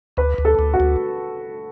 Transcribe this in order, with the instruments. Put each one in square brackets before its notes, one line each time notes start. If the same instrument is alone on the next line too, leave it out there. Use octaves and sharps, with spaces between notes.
[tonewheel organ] D2 [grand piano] B4
[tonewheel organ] D2
[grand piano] A4
[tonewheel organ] D2
[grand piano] F#4
[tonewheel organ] D2